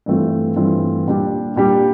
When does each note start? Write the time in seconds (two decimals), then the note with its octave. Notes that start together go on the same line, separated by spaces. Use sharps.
0.06 G2 E3 A3 C4 F4
0.56 G2 E3 A3 C4 F4
1.07 A#2 G3 D4 G4
1.56 A#2 G3 D4 G4